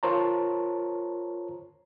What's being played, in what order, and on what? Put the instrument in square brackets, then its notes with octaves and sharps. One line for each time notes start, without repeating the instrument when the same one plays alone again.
[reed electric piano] F4 A#4 C5 C#5 A5 A#5